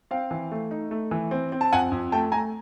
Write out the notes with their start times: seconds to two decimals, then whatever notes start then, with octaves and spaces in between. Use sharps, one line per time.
0.11 C4 F5 G5
0.31 E3
0.51 A3
0.71 D#4
0.91 A3
1.11 E3
1.31 C4
1.52 C4
1.61 A5
1.73 F2 F#5 G#5
1.92 F2
2.12 A3 G5 A5
2.32 A3 G#5 A#5